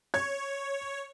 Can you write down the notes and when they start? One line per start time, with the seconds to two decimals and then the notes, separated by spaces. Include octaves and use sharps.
0.14 C#5 G#6